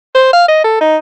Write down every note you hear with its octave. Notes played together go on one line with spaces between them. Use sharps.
C5
F5
D#5
A4
D#4